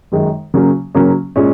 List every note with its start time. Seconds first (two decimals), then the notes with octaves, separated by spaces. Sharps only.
0.12 F#2 D#3 G#3 D#4
0.54 C#3 F#3 A#3 C#4
0.95 C#3 F#3 A#3 C#4
1.36 A#2 G#3 C#4